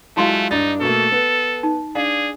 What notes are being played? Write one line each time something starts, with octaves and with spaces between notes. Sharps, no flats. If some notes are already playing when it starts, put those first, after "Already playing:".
F#3 G#3 A3 E4 F4 F5 C6
G2 D4 D#4 A6
B2 A3 A#3 A4
B3
D#4
D4 G#4 F5